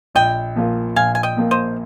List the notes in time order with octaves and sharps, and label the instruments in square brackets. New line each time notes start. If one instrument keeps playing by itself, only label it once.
[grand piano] A#1 [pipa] D#5 G5
[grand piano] A#2 F3 A#3 F4
[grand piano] A#1 [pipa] F5 G#5
[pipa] G#5
D#5 G5
[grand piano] A#2 F3 A#3 F4
[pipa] C5 D#5